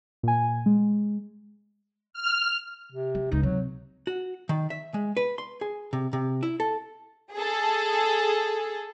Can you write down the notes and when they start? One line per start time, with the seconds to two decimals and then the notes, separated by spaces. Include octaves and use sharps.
0.23 A#2 G#5
0.66 G#3
2.13 F6
2.92 C3
3.15 F#3
3.31 D#1 C#2 D#4
3.43 C3 F#3
4.07 F#4
4.49 D#3
4.70 E5
4.94 G#3
5.17 B4
5.38 C6
5.61 G#4
5.93 C3
6.13 C3
6.43 E4
6.60 A4
7.33 G#4 A4